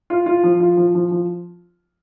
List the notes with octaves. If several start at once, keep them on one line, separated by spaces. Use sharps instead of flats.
F4
F4
F3
F4
F3
F3
F3